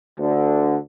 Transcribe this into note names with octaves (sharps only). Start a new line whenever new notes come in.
D2 D3